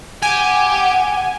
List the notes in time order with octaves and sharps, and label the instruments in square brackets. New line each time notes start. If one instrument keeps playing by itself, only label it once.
[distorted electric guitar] G4 [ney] F#5 [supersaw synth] G#5